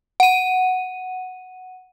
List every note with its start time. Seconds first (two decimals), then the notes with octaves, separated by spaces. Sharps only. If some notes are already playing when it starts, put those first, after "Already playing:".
0.20 F#5 D#7